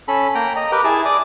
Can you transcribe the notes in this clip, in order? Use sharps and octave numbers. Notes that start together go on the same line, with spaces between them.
C#4 A4 B5
A#3 G5 A#5
D#5 A#5
G4 A#4 B4 G5
E4 G#4 A5
D5 D6 D#6